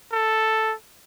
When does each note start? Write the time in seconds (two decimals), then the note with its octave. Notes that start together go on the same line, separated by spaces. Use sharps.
0.12 A4